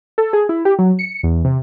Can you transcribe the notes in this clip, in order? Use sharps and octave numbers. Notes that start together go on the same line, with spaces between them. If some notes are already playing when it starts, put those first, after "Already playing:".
A4
G#4
E4
G4
F#3
C#7
E2
C3